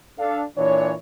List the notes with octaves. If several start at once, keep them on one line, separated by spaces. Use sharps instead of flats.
D4 A4 F5
A#2 E3 D4 C#5